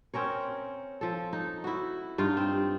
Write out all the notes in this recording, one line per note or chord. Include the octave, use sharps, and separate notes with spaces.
C4 C#4 A#4 C#5
F3 A4
D#4
E4 F#4
G2 D#4 F4
C4